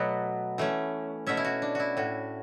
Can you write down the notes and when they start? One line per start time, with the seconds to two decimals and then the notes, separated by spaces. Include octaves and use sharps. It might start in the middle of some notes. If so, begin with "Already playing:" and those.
Already playing: B2 F#3 A3 B3
0.58 E3 A3 C#4
1.27 B2 A3 C#4 E5
1.37 E4
1.44 F#4
1.62 D4
1.75 E4 F#4
1.97 A2 F#4